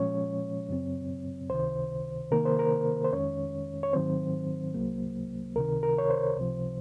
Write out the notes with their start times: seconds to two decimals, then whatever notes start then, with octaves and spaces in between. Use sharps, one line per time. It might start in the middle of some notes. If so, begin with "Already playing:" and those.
Already playing: A#2 F3 G#3 C#4 C#5
0.69 F#2 C#3 F#3 C4
1.50 C#2 C3 D#3 C5
2.31 C3 D#3 A#3 A#4
2.45 C5
2.59 A#4
3.05 C5
3.12 F2 D#3 G#3 C#4 C#5
3.83 C#5
3.93 G#2 D#3 F#3 C4 C5
4.74 C2 C3 F#3 A#3
5.56 C#2 C3 D#3 A#4
5.83 A#4
5.98 C#5
6.10 C5
6.37 C#2 C3 F3